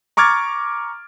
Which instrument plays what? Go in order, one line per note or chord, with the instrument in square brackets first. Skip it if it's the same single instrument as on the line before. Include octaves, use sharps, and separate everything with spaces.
[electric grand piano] A#5 C#6 D6 F6 G#6 A6